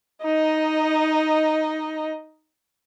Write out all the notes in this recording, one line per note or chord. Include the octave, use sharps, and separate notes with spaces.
D#4 D#5